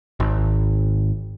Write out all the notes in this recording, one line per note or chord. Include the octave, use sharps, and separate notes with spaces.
G#1